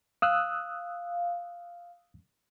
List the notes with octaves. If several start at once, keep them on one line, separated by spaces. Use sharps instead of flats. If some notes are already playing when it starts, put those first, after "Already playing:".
F5 D#6 E6 F#6